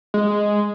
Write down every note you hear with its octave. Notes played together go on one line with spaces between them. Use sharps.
G#3